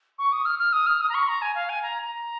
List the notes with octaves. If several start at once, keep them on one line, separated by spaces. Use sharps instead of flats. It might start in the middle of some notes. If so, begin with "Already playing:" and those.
C#6
D#6
F6
F6
D#6
F6
D#6
A#5
C#6
A#5
G#5
F5
G#5
A#5
A#5